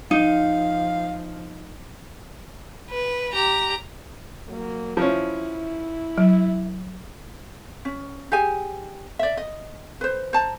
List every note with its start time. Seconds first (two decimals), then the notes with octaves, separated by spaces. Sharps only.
0.11 F3 D#4 F5
2.90 B4
3.33 G4 A#5
4.47 F#3 A#3
4.97 F3 C#4 E4
6.18 F#3
7.85 C#4
8.32 G4 G#4 G#5
9.19 D5 E5
9.37 D#5
10.01 B4 C5
10.33 C5 A5 A#5